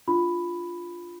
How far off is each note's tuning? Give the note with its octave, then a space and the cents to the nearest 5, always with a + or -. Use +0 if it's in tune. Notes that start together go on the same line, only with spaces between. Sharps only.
D4 +0 F4 +0 B5 +5